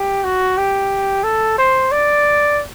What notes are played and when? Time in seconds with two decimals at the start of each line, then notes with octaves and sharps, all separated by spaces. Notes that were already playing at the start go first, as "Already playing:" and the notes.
Already playing: G4
0.24 F#4
0.58 G4
1.24 A4
1.58 C5
1.92 D5